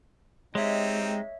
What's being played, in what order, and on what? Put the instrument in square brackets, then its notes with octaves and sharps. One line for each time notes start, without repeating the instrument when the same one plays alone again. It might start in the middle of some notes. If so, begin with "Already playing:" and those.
[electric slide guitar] G#3 [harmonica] C4 D#4 G4 [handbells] C#5 D#5 E5